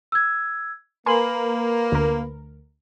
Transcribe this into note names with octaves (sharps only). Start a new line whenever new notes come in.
E6 G#6
A#3 A#4 B4 G#5 B5 C6 F#7
D2 A#4